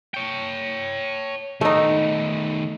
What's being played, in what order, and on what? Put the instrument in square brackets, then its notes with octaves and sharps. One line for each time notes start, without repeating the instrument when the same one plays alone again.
[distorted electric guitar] C#5 G5
[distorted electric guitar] D#3 B3 [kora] A3 D#4